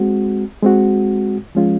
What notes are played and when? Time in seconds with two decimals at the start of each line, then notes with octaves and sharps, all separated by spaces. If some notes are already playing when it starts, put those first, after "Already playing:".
Already playing: G#3 C4 F#4
0.63 G#3 C4 F#4
1.55 F3 G#3 C#4 F4